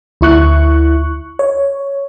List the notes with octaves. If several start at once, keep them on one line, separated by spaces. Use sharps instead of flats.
D2 E4 C#6 F#6
C#5